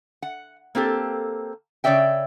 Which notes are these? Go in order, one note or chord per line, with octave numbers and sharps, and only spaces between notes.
F#5
A#3 C4 G4 A4
C#3 C#5 D5 E5 G5